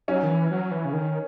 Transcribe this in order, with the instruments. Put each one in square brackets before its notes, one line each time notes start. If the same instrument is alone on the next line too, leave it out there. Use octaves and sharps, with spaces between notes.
[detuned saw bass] F#3 [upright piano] C#4
[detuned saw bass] D#3
E3
F#3
E3
C#3
D#3